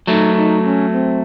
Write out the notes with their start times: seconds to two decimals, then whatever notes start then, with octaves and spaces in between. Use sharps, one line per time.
0.07 F#3 A3 D#4
0.35 D#4
0.63 C#4
0.91 C4